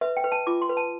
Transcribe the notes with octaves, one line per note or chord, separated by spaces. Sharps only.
B4 E5
G5
B4
A5
F4 D6
C6
B4
A5